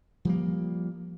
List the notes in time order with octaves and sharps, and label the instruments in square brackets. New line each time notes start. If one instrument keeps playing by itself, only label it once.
[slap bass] F3 G3 A#3